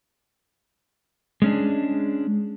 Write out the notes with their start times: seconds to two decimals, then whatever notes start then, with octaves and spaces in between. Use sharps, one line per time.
1.42 G#3 C#4 D4